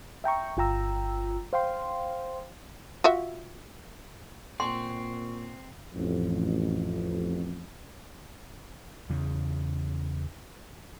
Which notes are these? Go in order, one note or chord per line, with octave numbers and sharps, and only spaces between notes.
E5 G5 A#5 C#6
G1 F4 G5 A#5 E6
C5 F5 G5 C6
F4 F#4 E5
A#2 C4 F#5 G#5 C6 C#6
A1 F2
E2 C#3